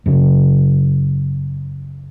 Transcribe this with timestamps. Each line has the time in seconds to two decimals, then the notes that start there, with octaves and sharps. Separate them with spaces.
0.06 F#2 C#3